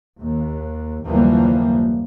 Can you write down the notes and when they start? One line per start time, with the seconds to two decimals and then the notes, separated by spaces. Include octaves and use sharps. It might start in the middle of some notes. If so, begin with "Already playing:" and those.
0.19 D#2
1.05 F#1 D#2 E3 F3 G3 A#3